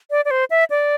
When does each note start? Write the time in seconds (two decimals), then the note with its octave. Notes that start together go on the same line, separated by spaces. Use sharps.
0.11 D5
0.25 D5
0.31 C5
0.50 E5
0.70 D5